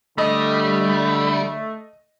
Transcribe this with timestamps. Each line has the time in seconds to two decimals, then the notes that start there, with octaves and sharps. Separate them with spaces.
0.18 D3 G3 A3 D#5